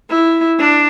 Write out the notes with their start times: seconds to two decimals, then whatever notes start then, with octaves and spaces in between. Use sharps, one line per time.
0.10 E4
0.60 D4